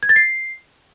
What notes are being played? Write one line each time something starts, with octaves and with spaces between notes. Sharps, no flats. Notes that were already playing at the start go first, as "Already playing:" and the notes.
G#6
A6
C7